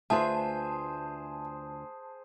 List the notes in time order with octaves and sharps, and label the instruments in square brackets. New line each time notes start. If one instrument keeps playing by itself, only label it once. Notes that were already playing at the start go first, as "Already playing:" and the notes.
[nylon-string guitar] D2 F4 B4 [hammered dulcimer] G#4 C5 [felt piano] E5 [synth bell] A5